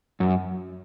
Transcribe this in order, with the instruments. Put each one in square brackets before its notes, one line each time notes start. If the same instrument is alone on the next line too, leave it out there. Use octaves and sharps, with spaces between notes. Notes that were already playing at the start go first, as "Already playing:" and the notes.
[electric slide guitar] F#2